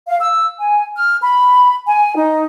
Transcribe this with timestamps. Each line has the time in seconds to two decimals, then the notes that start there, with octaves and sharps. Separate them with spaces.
0.08 F5
0.20 E6
0.59 G#5
0.96 F6
1.22 B5
1.86 G#5
2.16 D#4